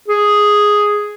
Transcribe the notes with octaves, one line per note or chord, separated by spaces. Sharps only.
G#4